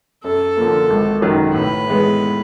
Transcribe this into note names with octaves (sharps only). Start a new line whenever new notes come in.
F#2 A4
D3 F3 A#3
G#1
F#2 D#3 F#3
A2 B4
E3 G#3 B3